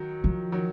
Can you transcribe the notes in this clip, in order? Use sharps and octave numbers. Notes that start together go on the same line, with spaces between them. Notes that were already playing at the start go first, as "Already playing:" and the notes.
Already playing: D#3 F#3
F3
D#3 F#3